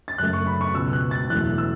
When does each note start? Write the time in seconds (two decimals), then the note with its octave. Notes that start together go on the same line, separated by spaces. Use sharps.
0.08 A6
0.18 F#2 C#3 A3 F#6
0.33 C#6
0.47 B5
0.61 C#6
0.74 C#2 B2 B3 E6
0.93 F#6
1.11 A6
1.30 E2 B2 F#3 A3 F#6
1.58 E6